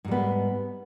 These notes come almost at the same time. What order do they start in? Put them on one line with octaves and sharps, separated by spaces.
G#2 G3 B3